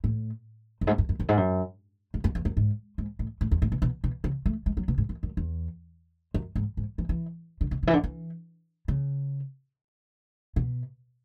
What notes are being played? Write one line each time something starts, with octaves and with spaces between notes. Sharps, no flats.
A2
F#2
G#2
F#2
F#2
F#2
G#2
F#2
G#2
F#2
E2
F#2
G#2
G#2
A2
A2
E2
A2
B2
B2
B2
C#3
A3
G#3
F#3
B2
G#2
F#2
F#2
E2
F#2
G#2
G#2
E3
E3
D3
B2
C#3
E3
D3
E3
C#3
B2